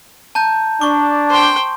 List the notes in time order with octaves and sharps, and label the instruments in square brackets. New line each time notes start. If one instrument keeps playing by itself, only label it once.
[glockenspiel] A5 A#5 G6
[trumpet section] D4 [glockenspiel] C#6 D6
[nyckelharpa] C5 G5